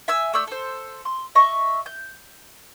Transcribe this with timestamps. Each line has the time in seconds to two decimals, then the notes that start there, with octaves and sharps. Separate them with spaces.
0.08 E5 G#5 E6
0.33 A3 D5 E6 G6
0.47 A4 C5
1.05 C6
1.35 D#5 E5 C#6
1.86 G6